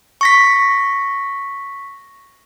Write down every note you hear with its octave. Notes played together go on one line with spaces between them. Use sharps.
C#6 A#6 B6